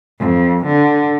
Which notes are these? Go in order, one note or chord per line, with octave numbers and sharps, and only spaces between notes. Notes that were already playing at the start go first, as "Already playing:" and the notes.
F2
D3